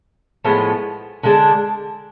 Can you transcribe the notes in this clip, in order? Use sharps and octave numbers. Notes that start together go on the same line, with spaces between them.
A2 F3 G#3 B3
D3 G#3 D4